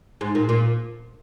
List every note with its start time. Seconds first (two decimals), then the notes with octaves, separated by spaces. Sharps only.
0.21 G#2
0.35 A#2
0.49 A#2